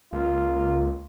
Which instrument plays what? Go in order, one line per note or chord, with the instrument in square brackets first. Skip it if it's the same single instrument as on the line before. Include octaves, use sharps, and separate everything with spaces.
[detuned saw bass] C#2 [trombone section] A#3 F4